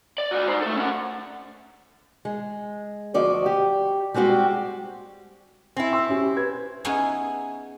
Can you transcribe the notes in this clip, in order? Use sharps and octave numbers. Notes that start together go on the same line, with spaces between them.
D5
F#4 D5
D#4 C5
A3 A4
C#4 F#5
G#3
D2 F3 F#4 D5 D#5
G4
G3 G#3 C4 F#4 G4
C4 E4 G#5
C6 E6
C#4 G4
B4 G#6
B3 C#4 D#4 E4 G#4 B4